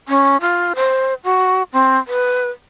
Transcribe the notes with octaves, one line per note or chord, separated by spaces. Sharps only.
C#4
F4
C5
F#4
C4
B4